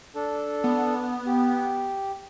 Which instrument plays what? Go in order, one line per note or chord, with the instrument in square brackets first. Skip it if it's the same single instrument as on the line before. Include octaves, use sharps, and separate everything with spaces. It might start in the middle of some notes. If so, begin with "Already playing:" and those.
[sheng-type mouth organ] D4 A4
[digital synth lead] B3
[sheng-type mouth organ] G4